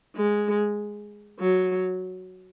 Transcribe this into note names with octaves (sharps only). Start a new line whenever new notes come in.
G#3
F#3